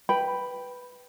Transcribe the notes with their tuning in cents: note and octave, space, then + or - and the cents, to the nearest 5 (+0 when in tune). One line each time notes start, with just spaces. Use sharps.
B4 +0 G5 +0 B5 +0